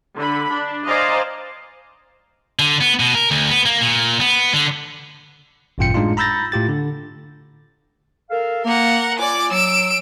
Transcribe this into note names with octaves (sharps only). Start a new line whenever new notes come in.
D3 B5
D4
C5 D5 D#5 F5 G#5 A#5
D3
B3
B2
A#4
D2
B3
A#3
A#2
B3
D3
G#1 F#2 A#2 F4 G5 C#7
A2 G#3 D4 D#4 F4
A#5 B5 E6 G6 A6 A#6
A2 F4 G4 A6
D3
A4 A#4 F5
A#3 A#4 F#5
F4 D5 G#5 D6
F#3 E6 D7